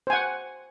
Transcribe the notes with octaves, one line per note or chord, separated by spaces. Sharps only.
C5 F#5 G#5